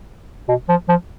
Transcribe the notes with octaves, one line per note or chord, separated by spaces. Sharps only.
B2
F3
F3